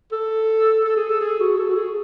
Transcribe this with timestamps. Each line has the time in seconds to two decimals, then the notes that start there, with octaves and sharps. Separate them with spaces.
0.12 A4
0.85 A4
0.97 G#4
1.10 A4
1.21 G#4
1.40 F#4
1.58 A4
1.69 F#4
1.76 G#4